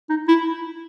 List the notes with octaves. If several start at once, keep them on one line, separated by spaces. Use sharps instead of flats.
D#4
E4